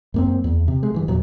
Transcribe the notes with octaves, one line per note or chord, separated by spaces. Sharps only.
F#2 A#3 C4
E2
C3
G#3
G2 E3
E2 A#2 F#3